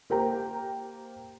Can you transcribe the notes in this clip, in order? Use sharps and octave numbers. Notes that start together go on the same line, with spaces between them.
A#3 G4 A#4 C5 G5 A#5